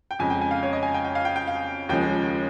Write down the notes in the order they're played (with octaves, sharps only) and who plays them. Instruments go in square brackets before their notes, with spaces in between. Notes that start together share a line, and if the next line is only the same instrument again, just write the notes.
[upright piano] G5
F2 C#3 G#3 G#5
G5
G#5
F5
C#5
D#5
G#5
G5
G5
F5
G5
G5
F5
D#2 C#3 F3 G#3 G5